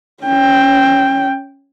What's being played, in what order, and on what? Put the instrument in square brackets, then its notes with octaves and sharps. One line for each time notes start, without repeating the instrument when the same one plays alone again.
[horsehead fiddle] C#4 G5